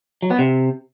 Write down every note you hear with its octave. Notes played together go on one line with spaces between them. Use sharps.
F#3
B3
C3